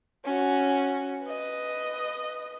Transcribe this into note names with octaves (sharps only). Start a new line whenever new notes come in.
C#4 F#4
B4 D#5